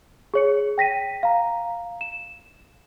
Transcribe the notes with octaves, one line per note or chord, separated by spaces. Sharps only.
G#4 C#5 C#7
G5 A#6 B6 D#7
F5 A#5
E7